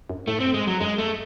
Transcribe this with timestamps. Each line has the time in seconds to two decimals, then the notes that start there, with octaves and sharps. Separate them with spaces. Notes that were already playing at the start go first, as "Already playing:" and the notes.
0.09 F#2
0.27 A2 A3
0.36 G#2
0.40 C4
0.45 F#2
0.53 G#2 G#3
0.67 F#3
0.80 F#2 G#3
0.98 A3